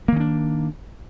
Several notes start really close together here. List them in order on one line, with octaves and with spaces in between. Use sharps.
A#3 D#3 C#4 D4